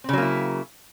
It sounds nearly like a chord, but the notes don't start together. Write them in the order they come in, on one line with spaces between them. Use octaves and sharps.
C4 C#3 F#3 A#3 E4